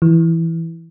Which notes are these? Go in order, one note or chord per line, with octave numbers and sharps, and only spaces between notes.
E3